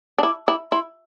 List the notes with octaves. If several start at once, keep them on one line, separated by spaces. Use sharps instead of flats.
D4
E4 D6
E4 D6
E4 C6